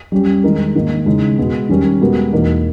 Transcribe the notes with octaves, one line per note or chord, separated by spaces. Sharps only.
G3 C#4 G4
D#3 G#3 D#4 A#4
G#2 D#3 A#3 D#4
C#3 E3 G#3 D#4
B2 G#3 B3
D#3 G3 C#4 G4 A#4
B2 G#3 B3 G4 A#4
E2 B2 A#3 D#4 A#4